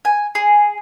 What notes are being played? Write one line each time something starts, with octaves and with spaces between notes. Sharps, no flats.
G#5
G#4